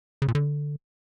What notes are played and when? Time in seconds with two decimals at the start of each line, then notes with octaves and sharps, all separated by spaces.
0.22 C#3
0.28 A#2
0.35 D3